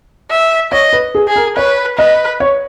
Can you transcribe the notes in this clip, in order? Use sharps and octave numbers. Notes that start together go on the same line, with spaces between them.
E5
C#5 D#5
B4
G#4
G#4
A#4
B4 C#5
B4 D#5
C#5